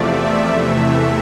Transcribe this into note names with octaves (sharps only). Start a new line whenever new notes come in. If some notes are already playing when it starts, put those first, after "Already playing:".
Already playing: E2 C3 F3 A3 D5 E5
E2 C3 E3 A3